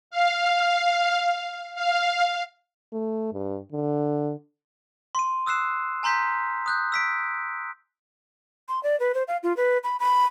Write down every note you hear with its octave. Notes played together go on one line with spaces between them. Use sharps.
F5
F5
A3
G2
D3
C6 D#7
D#6 E6 F#6 C7 E7
G#5 A#5 C6 G6 B6
D#6 F#6 G6
E6 B6 D7
C6
D5
B4
C5
F5
F4
B4
B5
B5